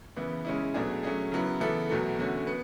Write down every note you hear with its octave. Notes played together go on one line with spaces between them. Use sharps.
C#3 E3 B3 E4
C#3 G#3 C#4 E4
B2 F#3 A3 D4 G#4
F#3 A3 C#4 G#4
C#3 F#3 B3 E4
C#3 E3 B3 E4 A4
E2 B2 F#3 A3
E2 D3 A3 C#4 F#4
B3